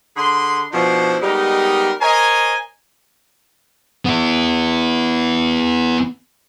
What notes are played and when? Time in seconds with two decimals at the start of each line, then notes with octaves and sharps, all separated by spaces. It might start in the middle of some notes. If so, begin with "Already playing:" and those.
0.17 D3 G#4 B5 C6
0.72 B2 F3 D4 E4 C5
1.22 G3 G#3 B3 D#4 G4 A#4
2.01 A#4 C5 C#5 D#5 G#5
4.05 B3 E4